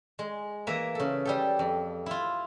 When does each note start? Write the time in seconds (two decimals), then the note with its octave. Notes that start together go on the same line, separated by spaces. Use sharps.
0.19 G#3
0.67 E3 A#3 E5 A#5
0.95 C#3 A4
1.25 G3 G4 A4
1.59 F2
2.06 E4 F4